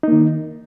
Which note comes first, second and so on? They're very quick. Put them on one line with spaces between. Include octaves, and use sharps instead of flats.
D#4 A#3 D#3